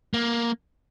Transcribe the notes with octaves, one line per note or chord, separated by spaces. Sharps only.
A#3